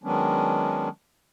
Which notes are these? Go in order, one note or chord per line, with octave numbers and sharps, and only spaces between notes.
D#3 F#3 G#3 B3 C#4 D4